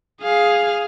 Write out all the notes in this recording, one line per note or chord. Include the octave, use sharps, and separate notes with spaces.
G#4 F5